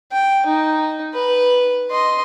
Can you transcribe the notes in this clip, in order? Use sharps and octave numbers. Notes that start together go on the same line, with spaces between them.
G5
D#4
B4
D#5 C6